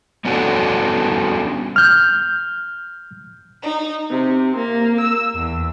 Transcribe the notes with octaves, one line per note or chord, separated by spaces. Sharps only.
G3 B3 C#4 D4 F#4 A4
F6 G6
D#4
C3
A#3
E6
E2